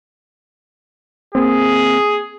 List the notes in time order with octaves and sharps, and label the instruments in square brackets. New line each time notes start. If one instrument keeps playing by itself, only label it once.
[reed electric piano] A#3 C4 [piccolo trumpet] G#4